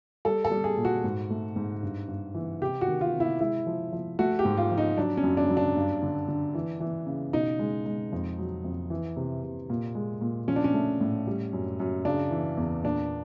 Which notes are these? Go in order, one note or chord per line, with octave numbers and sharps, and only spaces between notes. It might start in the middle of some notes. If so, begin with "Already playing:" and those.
G3 A4
A4
G3
G#4
A#2
F#4
G#2
A3
G#2
G2
G2
E3
C3 G4
F#4
D#3
F4
C3
E4
G#3 E4
F3
F3
A3 F#4
G4
G#2
F4
F3
D#4
F#3 D4
C#4
F#2
D4
F#3
D4
G2
D3
D3
E3
E3
C#3
B2 D#4
G#3
G#3
F2
F#3
F2
E3
C3
C3
A#2
G#3
A#2
F3 C#4
D4
C#4
A3
A2
G3
F#2
F#2
C#3 D4
E3
E2
A#2 D4